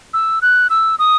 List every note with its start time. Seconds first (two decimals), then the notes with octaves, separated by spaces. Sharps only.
0.14 E6
0.42 F#6
0.70 E6
0.99 D#6